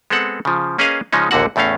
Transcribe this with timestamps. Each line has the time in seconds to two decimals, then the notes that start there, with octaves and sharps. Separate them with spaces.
0.10 G#3 B3 C4 A4 F#5
0.45 C#3 F3
0.79 A#3 C#4 G#4 B4 D#5 F5
1.13 C#3 F3 G#3 C#4 D#4
1.31 A#1 D#2 A#2 D3 F#4 F#5
1.56 E2 A2 A3 C#4 F5